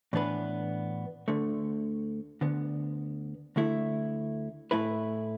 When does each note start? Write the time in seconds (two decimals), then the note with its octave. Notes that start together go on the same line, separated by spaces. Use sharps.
0.13 A2 E3 B3 D4 B4
1.28 D2 D3 A3
2.41 D2 D3 B3
3.56 D2 D3 A3 E4
4.71 A2 A3 E4 B4